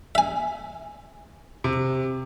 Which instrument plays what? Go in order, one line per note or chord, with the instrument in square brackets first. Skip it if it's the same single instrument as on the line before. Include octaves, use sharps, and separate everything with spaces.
[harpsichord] E5 G#5
[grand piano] C3